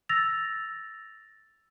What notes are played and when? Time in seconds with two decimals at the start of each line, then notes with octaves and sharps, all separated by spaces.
0.09 E6 A6 A#6 F7